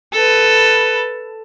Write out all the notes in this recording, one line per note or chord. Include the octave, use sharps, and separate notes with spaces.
A4 B4